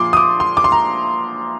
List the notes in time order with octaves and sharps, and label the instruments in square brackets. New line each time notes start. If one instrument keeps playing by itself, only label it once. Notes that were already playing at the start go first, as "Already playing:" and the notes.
Already playing: [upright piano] A#2 F3 C6 D6
D#6
D6
C6
D6
C6
A#5